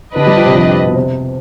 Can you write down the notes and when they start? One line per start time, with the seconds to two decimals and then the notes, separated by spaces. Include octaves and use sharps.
0.16 D3 D4 G4 B4 D#5
0.26 G3
0.36 F3
0.46 C3
0.55 F2
0.86 B2
0.96 C3